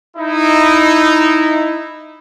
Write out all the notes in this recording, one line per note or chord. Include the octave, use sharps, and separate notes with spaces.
D#4 E4